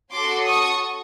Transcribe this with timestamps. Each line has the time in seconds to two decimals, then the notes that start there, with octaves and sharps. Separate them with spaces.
0.12 C#4 F#4 A4 C6 D6
0.46 C#6 D#6